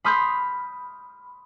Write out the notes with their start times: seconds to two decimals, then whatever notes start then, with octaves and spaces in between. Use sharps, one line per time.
0.04 B5 C6 D#6 F6 G6 C7